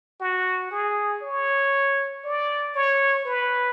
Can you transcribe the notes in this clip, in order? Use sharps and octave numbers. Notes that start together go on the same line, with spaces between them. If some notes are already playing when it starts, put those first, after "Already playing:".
F#4
G#4
C#5
D5
C#5
B4